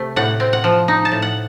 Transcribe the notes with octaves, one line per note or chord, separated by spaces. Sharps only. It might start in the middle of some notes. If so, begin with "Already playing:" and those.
Already playing: C3 A3
A2 F#5
C4
F#5
F3
D#4
A5
A2
F#5